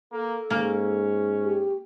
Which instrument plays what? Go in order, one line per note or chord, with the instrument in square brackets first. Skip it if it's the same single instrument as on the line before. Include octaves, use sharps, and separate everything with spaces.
[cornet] A#3 [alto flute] A4
[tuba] G#2 [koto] A#3 [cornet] C#4
[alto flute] G4